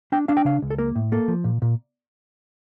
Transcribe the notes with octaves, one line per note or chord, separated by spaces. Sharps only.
D4 G5
D4 F5
G5
C#3 F5
C#2
A4
A#3 A#4
A2
A#3 A4
F3
A#2
A#2